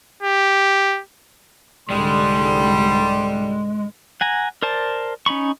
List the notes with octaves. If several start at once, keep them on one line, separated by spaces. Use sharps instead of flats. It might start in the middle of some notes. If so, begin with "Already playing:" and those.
G4
C2 G#2 D3 G3 G#3 C6
F#5 G#5 A#5
A#4 C5 D5 A5
C#4 D#4 B5 C#6